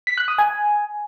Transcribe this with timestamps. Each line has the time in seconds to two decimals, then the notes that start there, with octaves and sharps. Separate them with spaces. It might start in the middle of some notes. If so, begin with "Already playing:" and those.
0.07 B6
0.18 F#6
0.28 D#6
0.38 G#5